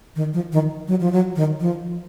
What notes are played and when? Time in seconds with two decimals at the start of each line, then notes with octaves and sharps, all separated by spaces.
0.16 D#3
0.34 F3
0.52 D#3
0.88 F#3
1.00 F3
1.12 F#3
1.36 D#3
1.61 F3